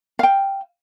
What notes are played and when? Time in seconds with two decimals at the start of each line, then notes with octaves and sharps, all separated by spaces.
0.19 F5 G5